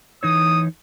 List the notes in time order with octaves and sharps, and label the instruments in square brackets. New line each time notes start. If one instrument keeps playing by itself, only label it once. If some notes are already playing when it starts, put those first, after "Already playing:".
[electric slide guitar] E3 D#4 C#5 [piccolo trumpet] D#6